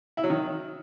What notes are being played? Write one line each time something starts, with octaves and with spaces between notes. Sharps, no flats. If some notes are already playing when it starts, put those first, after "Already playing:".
E4
F#3
D#3